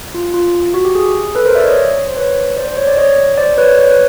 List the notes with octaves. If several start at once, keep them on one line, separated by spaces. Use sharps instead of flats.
F4
F4
F#4
G4
G#4
A4 B4
A#4 C5
D5 E5
C#5 D#5
C5
B4 C#5
C5 D5
C5
C#5
D5
C#5 D#5
C5 D5
D5
B4 C#5
B4 C#5
B4